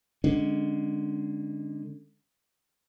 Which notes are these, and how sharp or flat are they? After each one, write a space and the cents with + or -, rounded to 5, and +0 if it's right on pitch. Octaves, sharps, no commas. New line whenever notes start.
D3 +15 G#3 +0 C#4 +0